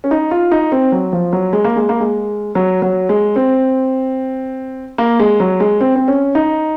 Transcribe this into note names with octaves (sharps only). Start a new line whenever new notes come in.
C#4
D#4
F4
D#4
C4
F#3
F3
F#3
G#3
A#3
G#3
A#3
G#3
F#3
F#3
G#3
C4
A#3
G#3
F#3
G#3
C4
C4
C#4
D#4